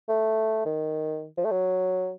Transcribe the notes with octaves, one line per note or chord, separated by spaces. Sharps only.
A3
D#3
F3
A3
F#3